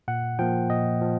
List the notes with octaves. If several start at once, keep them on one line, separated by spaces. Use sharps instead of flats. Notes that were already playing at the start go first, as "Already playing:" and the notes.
A#2 F#5
F3 A#3 G5
A#2 D#5
F3